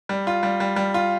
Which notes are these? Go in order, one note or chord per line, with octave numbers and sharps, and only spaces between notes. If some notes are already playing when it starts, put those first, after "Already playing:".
G3
F4
G3
G3
G3
F4